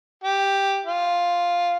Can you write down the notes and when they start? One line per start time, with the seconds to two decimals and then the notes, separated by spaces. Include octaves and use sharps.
0.24 G4
0.86 F4